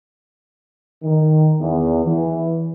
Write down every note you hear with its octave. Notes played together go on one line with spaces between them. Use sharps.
D#3
E2
E3